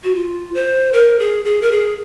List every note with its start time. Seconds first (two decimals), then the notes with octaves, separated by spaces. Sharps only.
0.04 F#4
0.15 F4
0.54 C5
0.93 A#4
1.19 G#4
1.45 G#4
1.62 A#4
1.71 G#4